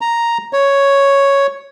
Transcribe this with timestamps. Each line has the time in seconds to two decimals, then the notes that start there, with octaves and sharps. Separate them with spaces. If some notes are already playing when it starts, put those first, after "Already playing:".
0.01 A#5
0.53 C#5